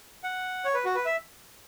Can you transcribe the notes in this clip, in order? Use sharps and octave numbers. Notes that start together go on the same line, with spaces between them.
F#5
C#5
B4
F#4
B4
E5